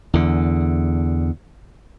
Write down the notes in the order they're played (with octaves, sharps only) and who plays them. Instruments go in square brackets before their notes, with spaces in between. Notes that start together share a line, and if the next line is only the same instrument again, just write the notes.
[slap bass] E2 D3